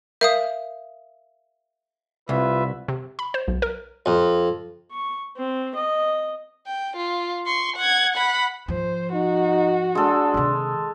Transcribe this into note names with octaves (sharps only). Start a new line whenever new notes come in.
A#4 E5 F5 D#6
C2 F4 B4 E5
C3
B5
C5
B1
A#4
F2
C#6
C4
D#5
G5
F4
C6 C#6
F#5 G#6
F#5 B5
G#2 F3 C5
D#4 F#4
G#3 D4 A4
C3 D#3